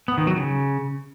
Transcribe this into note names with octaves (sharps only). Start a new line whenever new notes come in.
B3
D#3
F#3
C#3